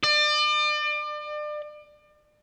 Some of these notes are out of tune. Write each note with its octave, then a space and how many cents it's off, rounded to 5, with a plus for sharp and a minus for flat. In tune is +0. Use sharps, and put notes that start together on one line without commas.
D5 +35